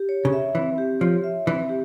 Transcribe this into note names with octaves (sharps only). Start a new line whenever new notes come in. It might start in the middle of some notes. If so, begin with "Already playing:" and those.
Already playing: G4
C#5
C#3
E5
E3 C4
G4
F3 C#5
E5
E3 C4
G4